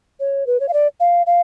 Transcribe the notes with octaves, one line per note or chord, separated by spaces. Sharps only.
C#5
B4
C#5
F5
D5
F5
F5